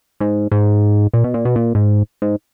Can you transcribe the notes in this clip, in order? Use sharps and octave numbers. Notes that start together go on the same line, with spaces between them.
G#2
G#2
A#2
B2
A#2
B2
A#2
G#2
G#2